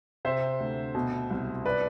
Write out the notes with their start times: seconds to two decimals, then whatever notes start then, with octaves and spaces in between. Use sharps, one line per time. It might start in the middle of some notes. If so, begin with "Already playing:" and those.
0.25 C3 C5 E5
0.60 D2
0.95 B2
1.31 C2
1.66 B4 D5